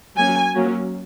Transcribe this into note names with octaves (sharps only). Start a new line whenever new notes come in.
F#3 A#3 C#4 G#5
F#3 A#3 C#4